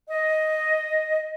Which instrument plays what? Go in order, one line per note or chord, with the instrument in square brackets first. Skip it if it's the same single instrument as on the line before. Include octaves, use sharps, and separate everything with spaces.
[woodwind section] D#5